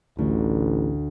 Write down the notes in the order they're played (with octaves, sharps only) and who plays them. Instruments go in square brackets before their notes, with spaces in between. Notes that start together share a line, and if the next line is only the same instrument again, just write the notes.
[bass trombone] A1 [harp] D2